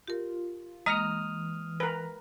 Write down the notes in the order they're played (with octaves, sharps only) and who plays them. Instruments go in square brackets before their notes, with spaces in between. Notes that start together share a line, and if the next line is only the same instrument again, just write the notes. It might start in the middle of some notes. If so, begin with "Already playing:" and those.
[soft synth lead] F4 [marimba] G4 A#4
[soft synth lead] E3 [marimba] G#3 A#3 [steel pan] D#5 A#5 [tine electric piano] D#6 F6
[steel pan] A#4 B4